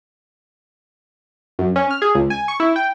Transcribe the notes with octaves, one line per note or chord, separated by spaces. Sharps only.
F#2
C#4
F6
G#4
C#2
G#5
C#6
E4
G5